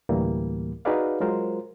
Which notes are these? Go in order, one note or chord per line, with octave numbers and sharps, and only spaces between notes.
D2 A2 E3 G3 A#3
D#4 F#4 G#4 B4 D5 F5
F#3 G#3 F4 A#4 C5